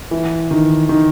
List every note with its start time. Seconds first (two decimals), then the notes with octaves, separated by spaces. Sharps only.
0.11 E3
0.51 D#3
0.89 D#3